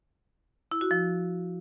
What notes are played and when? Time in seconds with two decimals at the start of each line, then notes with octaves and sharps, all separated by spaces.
0.71 E4
0.81 F#4
0.91 F3